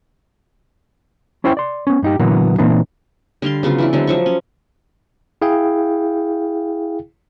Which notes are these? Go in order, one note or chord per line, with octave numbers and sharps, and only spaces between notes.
C#4 E4 C5 C#5 E5 G5
D5 C6
B3 C#4
G2 D#4 G4
A#2 D3 E3 F#3 A#3 B3
A#2 E3 A#3 C4 D4 D#4
D3 G3 F5 C6
C#3 F#3 B3 F4
E3 D4 E4
D3 F#3 G#3 C4
F3 F#3 C#6
C#4
E4 G#4 F5 G5